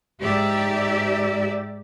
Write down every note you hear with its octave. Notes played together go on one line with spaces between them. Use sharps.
G#2 G4 D5 E5